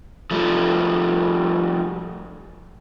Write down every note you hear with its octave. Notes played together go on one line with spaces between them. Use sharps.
F3 G3 A3